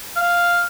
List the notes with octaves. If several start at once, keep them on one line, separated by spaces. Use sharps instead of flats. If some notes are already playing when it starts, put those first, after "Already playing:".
F5